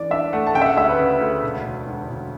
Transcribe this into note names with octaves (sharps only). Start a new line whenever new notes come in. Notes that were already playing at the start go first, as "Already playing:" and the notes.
Already playing: E3 C#4 D4 D5
D4 E5
A3 F#5
A5
C#3 G5
E5
F#5
D2 E5
B4
C#3
D2
E1
E1
E1
E1